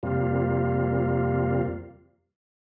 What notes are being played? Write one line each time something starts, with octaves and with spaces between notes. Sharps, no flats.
F2 C3 G3 A#3 F4